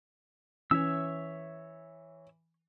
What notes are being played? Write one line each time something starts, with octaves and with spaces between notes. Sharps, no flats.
E3 C#4 C#5 E5 E6